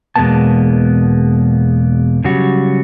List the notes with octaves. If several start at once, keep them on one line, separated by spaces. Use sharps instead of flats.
E2 B2 G#3 A#3 B3 A5
C#3 F#3 G3 F#4